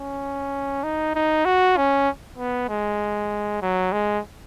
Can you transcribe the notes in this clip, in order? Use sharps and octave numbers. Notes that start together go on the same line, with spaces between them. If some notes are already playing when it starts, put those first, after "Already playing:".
Already playing: C#4
D#4
D#4
F#4
C#4
B3
G#3
F#3
G#3